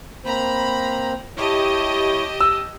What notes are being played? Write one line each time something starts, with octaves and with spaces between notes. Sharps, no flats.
A#3 C4 C5 A#5 B5
E4 G4 C#5 D#5 A5
E6